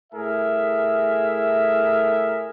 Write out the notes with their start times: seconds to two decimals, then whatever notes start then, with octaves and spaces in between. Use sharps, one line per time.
0.13 A2 G#4 A#4 E5